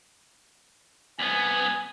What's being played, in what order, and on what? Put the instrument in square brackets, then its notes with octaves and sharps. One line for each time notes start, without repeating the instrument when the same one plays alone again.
[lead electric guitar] C2 B3 [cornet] G#5